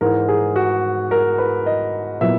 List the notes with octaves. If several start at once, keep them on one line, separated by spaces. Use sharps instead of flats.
G#2 E3 G#3 A#4
G#4
F#4
A#4
B4
D#5
A#2 F#3 B3 E4 E5